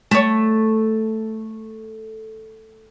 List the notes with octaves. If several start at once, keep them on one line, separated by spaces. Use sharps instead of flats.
A3 C#5